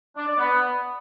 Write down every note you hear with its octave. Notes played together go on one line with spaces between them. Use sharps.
D4
D5
B3